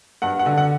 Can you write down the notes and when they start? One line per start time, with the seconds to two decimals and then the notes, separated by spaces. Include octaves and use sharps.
0.22 G2 F#5
0.39 F#5
0.46 D3
0.58 F#5